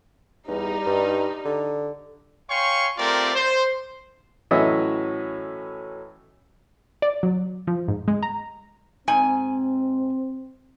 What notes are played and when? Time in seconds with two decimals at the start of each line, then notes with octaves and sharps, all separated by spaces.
0.48 E2 G3 D#4
0.86 G2
1.45 D3
2.51 C#5 F5 G5 G#5 C6 C#6
2.97 A3 C4 F4 G4 A#4 D5
3.35 C5
4.51 A2 E3 F#3 C#4 D#5 E5
7.02 D5
7.23 F#3
7.67 F3
7.88 G#2
8.08 G#3
8.23 A#5
9.08 G#2 C4 G#5